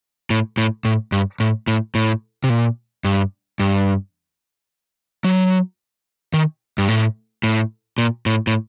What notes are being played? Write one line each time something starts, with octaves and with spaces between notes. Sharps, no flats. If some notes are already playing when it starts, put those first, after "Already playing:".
A2
A2
A2
G2
A2
A2
A2
C3
A#2
G2
G2
F#3
D#3
G2
A2
A2
A#2
A2
A2